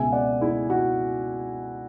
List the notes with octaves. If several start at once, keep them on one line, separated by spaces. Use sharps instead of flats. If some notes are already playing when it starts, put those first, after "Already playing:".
Already playing: C#2 B2 G#3 E5 G#5
D5 F#5
E4 G#4
F#4